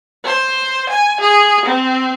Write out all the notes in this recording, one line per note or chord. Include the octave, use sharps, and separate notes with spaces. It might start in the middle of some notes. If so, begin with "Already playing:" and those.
C5
G#5
G#4
C4